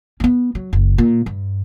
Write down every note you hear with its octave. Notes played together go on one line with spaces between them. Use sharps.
B3 C#4
F#3
F#1
A#2
G2